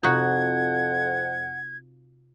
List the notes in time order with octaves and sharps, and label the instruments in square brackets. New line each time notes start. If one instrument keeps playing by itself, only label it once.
[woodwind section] F2 F#5 [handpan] C3 C4 F4 [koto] D#4 F#4 [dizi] G#6